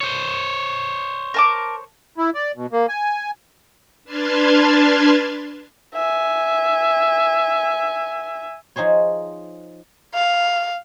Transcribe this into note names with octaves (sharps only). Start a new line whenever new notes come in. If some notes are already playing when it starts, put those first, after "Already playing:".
C5 C#5
A#4 A5 D6
E4
D5
B2
A#3
G#5
D4 B4 A5 C6 F6 G#6
E5 G#5
F3 D#4 G#4 C5 C#5
F5